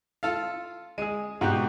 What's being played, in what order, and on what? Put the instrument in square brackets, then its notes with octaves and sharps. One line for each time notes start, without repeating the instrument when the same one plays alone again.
[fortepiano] F4 A4 F5
[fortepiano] G#3 G#4 [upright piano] D#7
[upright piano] G#2 B2 F#6 [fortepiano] F#4 G4